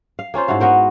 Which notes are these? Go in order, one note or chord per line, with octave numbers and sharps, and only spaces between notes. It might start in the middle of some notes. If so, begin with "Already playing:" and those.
F5
A#3 C#4 F4 C5
G#2 E4 F#4 F5
B3 F#4 A#4 C5